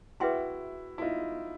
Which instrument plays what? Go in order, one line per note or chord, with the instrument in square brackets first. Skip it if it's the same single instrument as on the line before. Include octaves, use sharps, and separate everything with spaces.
[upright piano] E4 F#4 [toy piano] G#4 B4 E5 G5 C6
[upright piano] E4
D#4 F4